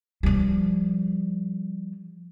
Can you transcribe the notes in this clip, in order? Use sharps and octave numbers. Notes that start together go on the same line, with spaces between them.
F3 G3